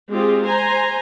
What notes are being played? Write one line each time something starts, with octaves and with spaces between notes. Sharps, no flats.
G#3 C4 F4 G4 G#4
C5 G#5 A#5 C6